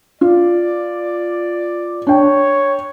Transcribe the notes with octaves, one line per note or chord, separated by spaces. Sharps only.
F4 D5
D4 C#5 G5